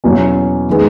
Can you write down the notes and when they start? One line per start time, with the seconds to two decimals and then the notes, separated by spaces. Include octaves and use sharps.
0.04 E2 B2 F#3 C#4
0.69 D#3 G#3 B3